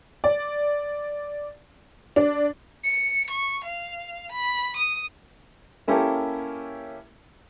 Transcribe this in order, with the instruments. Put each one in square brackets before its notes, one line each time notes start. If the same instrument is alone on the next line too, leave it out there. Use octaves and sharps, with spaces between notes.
[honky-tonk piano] D5
D4
[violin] C#7
C#6
F5
B5
D#6
[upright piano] A#3 C#4 E4 G4 A4 A#4